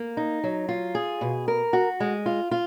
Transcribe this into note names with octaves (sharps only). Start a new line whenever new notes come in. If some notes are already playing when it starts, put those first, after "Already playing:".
Already playing: A#3
D#4
F#3
F4
G#4
B2
A#4
F#4
G#3
F4
F4